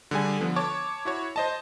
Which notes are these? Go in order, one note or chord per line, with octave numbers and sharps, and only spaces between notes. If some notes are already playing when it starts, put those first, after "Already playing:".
D3 G3 G#4 G#5
D3 F3 B3
C#5 A5 C#6 D6
E4 F#4 C#5
C5 D#5 A5